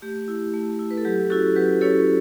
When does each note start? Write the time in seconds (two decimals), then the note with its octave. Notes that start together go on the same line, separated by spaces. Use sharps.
0.02 A3 G4
0.28 E4
0.54 A3
0.79 E4
0.91 B4
0.97 A4
1.05 F#3 G4
1.30 C#4 E4 F#4 A4
1.56 F#3 G4 B4
1.81 C#4 E4 A4 C#5